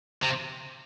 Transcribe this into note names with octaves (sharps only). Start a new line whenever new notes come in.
C3